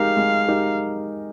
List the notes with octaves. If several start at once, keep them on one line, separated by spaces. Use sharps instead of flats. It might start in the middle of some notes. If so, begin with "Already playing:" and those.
Already playing: G#3 D#4 G4 A#4 F5
G#3
D#4 G4 A#4